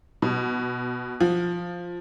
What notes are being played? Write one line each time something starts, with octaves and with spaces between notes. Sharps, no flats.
B2
F3